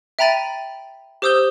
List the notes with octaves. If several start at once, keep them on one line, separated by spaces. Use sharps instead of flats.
E5 G5 A#5 B5 A6 D#7
G4 C5 D#6 E6 G6 G7